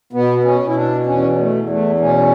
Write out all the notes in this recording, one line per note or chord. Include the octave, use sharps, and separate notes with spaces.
B2 B3
C#4
B2
E4
D4
E2 C#4
A3
E2
A3
B2 C#4